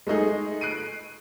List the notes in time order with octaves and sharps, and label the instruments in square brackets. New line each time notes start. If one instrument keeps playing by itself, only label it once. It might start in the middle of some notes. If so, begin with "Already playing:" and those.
[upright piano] G#3 A3 D#4 G#4
F#6 C7 D7 D#7